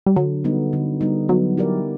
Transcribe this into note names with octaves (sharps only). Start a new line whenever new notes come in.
G3
D3 F#3
G3 B3 D#4
D3
G3 B3 D#4
F#3 B3
E4 G4 A#4 D5